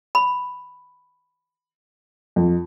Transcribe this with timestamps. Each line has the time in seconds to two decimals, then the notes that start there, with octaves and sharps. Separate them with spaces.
0.15 B5
2.36 F2